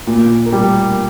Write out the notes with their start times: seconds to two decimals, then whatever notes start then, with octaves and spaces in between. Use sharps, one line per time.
0.07 A#2
0.46 A#3
0.52 G3